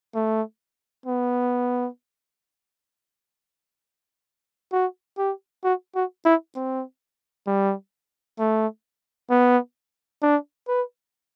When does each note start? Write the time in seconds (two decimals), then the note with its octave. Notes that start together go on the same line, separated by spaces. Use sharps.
0.15 A3
1.06 B3
4.72 F#4
5.18 G4
5.64 F#4
5.95 F#4
6.25 E4
6.56 C4
7.47 G3
8.39 A3
9.30 B3
10.22 D4
10.68 B4